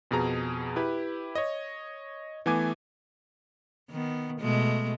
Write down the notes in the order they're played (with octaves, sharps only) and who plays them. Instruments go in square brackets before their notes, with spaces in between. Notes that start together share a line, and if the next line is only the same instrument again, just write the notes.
[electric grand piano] F2 B2 G#4 A#5
E4 G4 B4
C#5 D#5
E3 A3 B3 G#5 D6 G#6
[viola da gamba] D#3 B3
B2 G#3 A3